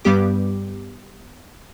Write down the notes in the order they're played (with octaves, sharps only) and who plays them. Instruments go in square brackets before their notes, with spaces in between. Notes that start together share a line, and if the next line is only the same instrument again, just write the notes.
[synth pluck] G2 G3 B3 G4 D6